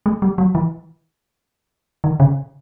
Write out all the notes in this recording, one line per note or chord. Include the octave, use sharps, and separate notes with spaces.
G#3
G3
F#3
E3
D#3
C#3